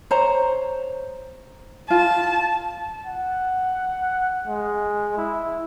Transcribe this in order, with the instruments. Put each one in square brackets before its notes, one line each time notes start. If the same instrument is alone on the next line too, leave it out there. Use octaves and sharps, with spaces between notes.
[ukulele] C5 C#5 A#5
[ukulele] F4 [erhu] A5
[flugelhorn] F#5
G#3
E4